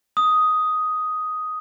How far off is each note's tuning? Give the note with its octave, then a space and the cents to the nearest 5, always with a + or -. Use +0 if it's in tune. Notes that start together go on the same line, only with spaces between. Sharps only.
D#6 +5